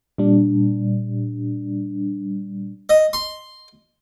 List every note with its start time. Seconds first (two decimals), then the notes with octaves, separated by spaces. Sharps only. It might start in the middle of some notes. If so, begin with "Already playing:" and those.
0.18 A#2 G3 D4
2.89 D#5
3.13 C6